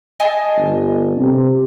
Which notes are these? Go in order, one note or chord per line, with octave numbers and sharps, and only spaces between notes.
D#5 G#5 A5
G1
C3